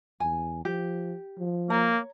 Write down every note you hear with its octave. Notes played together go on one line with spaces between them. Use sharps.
E2 G#5
F3 G4
F3
A#3 C#5 A#5